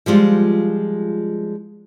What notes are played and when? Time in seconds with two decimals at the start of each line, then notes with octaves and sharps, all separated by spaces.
0.06 F3 G3 G#3 F4